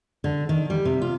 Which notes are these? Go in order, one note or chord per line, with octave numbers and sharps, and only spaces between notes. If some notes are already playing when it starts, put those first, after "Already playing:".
D3
D#3
G3
C3
F4